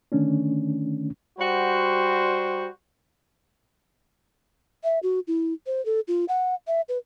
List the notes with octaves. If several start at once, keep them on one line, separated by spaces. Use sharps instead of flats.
D3 D#3 A3 C#4 D4
G3 F#4 C5
E5
F#4
E4
C5
A4
F4
F#5
E5
B4